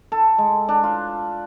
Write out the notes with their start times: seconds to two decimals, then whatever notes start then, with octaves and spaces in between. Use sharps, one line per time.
0.12 A4
0.38 G#3
0.69 D4
0.83 F4